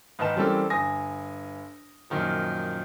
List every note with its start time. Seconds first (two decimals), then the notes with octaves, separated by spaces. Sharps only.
0.19 G#2 D#3 B4 D#5 A5 E7
0.36 E3 G3 C4 C#4 A4 A#4
0.70 G1 G#5 D#6 A#6
2.10 F#2 A#2 D#3 F3